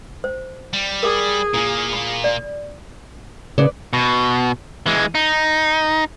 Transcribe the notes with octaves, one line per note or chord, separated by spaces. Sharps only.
C5
G3
G#4 A#4 D6
A#2 A#3 E4
B5
D5
C#3 B4 D5
B2
E3 G#3
D#4